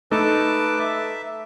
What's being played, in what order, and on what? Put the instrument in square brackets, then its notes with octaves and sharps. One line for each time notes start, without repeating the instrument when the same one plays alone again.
[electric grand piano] A3 D#4 A4 [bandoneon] B4 A5 D6
[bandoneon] E5